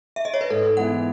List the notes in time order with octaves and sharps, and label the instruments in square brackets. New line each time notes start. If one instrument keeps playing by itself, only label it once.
[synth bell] E5
D#5
C#5
B4
[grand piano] G#2 [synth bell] A4
[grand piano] E3 G#3 B3 E4 [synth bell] F#5